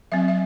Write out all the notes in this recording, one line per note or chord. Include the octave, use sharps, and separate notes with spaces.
F#3 C4 E5
E5